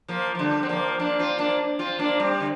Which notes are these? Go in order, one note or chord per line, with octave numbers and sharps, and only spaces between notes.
F3 A#3
F3
D3 G3
C4
F3 A#3
A#3 D4
C4 F4
A#3 D4
C4 F4
A#3 D4
G3 C4
D3